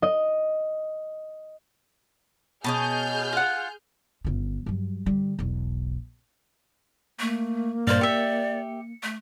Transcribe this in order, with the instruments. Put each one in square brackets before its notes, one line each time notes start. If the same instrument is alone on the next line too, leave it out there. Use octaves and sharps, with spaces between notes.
[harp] D#5
[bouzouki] B2 C#4 D#5 [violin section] G#4 F6 G6 [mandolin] A5
[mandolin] F4 F#5
[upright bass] G1 C#3
G2 F#3
D3 G3
E1 B1
[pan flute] A3 [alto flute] A#3
[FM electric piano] G2 A#2 [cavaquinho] C5 F5 [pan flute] D5
[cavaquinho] G4 E5 [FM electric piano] C#7
[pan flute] A3